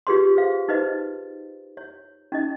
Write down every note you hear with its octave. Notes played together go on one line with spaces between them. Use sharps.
F4 G4 G#4 B4 C#5 C6
G#4 C5 F5
D#4 B4 C5 D#5
C#5
C#4 D#4 D#5